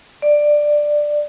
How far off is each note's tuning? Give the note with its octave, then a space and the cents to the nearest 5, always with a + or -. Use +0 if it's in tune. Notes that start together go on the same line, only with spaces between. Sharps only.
D5 +10